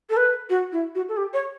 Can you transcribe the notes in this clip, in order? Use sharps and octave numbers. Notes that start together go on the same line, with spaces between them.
A4
B4
F#4
E4
F#4
A4
G4
C#5